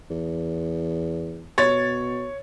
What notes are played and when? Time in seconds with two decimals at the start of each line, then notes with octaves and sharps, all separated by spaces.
0.10 E2
1.58 B2 C#5 A6